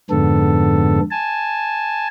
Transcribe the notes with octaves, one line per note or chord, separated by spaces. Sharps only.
F2 G#2 D3 B3 A4
G#5 A5